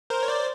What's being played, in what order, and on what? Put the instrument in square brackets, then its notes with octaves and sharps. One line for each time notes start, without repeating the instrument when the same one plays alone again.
[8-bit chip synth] A#4 C5
C#5
C5 D5